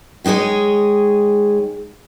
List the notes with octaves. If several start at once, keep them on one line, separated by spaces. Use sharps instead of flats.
D#3 G#3 D#4 G#4 C#5